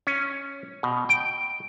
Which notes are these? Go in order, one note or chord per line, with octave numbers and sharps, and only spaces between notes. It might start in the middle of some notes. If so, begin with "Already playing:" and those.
C#4
B2
G5